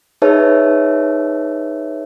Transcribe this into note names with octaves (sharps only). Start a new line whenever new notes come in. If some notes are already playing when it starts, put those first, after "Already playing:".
D#4 G#4 B4 C#5 E5 A5